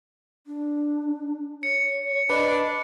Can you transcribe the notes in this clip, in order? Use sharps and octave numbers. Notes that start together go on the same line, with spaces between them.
D4
C#5 C#7
D4 B4 D#5